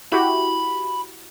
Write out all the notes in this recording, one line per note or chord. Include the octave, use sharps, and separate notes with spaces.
E4 F#4 G4 B5